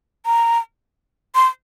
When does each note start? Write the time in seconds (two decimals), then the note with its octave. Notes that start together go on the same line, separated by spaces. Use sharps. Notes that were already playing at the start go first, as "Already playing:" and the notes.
0.26 A#5
1.35 C6